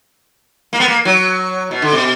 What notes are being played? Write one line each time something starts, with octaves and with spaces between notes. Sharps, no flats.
A#3
B3
A#3
F#3
B2
D3
B2